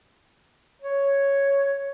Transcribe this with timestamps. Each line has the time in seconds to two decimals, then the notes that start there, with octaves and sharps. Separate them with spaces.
0.82 C#5